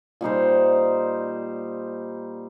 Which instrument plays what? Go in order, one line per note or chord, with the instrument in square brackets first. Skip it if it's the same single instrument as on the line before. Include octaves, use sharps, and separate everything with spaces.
[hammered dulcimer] A#2 G3 D#4 C5